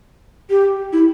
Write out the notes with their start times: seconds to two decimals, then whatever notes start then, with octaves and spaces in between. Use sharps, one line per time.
0.49 G4
0.92 E4